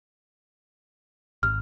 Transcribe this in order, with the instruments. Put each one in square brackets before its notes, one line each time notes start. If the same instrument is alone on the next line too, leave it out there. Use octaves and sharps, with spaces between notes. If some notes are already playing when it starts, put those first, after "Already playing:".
[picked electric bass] G#1 [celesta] F6